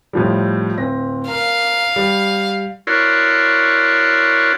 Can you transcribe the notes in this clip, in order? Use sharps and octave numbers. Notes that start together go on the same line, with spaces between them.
A2 F3 G3
D1 C4 A#6
A#4 F5
G3
E4 F#4 A#4 C#5 D5 C6